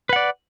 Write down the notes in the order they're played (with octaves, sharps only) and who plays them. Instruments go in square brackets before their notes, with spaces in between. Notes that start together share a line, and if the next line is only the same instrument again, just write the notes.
[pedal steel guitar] B4
F#5
D5